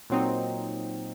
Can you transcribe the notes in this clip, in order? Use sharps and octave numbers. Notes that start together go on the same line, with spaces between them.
A#2 F#3 C4 D#4